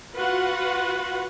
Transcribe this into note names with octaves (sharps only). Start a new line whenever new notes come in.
F4 F#4 B4 F#5